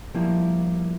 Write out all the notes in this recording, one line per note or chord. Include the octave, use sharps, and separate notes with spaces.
F3 G3 A#3 E4